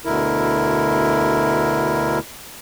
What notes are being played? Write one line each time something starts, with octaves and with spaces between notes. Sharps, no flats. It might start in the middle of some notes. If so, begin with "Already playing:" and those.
D2 B2 D3 E4 A#4